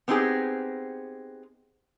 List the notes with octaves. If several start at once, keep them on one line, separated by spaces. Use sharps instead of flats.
B3 C4 D#4 G4 G#4